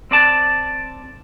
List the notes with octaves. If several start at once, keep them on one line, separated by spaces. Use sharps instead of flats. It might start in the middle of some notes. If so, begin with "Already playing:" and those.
C4 D5 A5